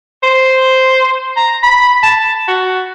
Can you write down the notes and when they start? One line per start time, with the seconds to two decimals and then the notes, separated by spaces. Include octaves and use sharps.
0.23 C5
1.36 A#5
1.63 B5
2.03 A5
2.48 F#4